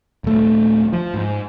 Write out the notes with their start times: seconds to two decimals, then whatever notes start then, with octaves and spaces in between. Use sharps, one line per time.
0.24 D#1 A3
0.93 F3
1.14 G#2